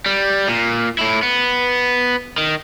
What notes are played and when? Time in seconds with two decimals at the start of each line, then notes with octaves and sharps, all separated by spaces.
0.06 G3
0.48 A#2
0.99 A2 E4
1.23 B3
2.38 D#3